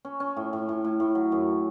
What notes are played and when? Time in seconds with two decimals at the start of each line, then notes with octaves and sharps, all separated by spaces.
0.05 C#4
0.20 C#4
0.37 A2
0.53 A2
0.69 A2
0.84 A2
1.00 A2
1.15 F#3
1.32 F#2